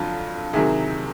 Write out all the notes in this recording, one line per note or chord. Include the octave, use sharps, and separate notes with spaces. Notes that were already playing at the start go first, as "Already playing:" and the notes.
Already playing: F2 D3 F#3 F4
C3 D#3 F#3 G#4